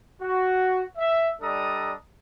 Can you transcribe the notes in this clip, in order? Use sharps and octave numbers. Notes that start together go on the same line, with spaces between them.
F#4
E5
G3 D4 A4 D#5 A#5 D#6